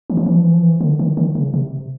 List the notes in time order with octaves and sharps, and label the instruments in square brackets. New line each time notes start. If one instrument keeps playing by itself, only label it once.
[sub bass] E3
F3
E3
F3
E3
F3
E3
D3
D#3
D#3
C#3
C3